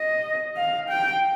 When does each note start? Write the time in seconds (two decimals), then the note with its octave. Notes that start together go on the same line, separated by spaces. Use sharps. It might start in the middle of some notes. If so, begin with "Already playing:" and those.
Already playing: D#5
0.57 F5
0.89 G5